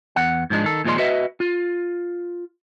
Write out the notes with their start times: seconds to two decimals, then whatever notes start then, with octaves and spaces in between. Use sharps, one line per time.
0.16 E2 F#5
0.50 G#2 F3 G#3 D4
0.64 D#3 A4
0.84 D#2 A#2 F3 G#3 D5 C6
0.98 F#4 B4 D#5 E5
1.40 F4